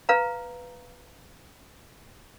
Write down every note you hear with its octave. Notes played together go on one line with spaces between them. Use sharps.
B4 F5 A#5